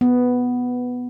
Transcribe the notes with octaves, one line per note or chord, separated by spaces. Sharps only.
B3